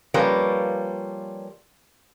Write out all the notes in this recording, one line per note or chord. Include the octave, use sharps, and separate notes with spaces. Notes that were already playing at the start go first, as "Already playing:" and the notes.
F3 G3 A#3 C#4 B4